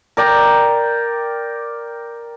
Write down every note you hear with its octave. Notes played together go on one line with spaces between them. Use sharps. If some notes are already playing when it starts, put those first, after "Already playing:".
A#4 D5 G5 A#5